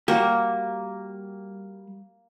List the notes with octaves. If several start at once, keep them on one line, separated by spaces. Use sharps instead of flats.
G3 A#3 F#4 G4